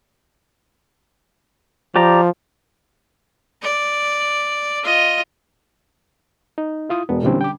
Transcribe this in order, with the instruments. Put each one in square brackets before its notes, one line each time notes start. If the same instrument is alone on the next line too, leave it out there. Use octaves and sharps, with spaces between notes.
[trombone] F3 [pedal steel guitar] G4 D5 A#5
[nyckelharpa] D5
F4 D#5
[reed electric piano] D#4
E4 F4 D#6
[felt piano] E1 [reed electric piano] B3
[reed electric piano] A#2 E3 C4 [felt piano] D3 G3 C#4
[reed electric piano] G5 D6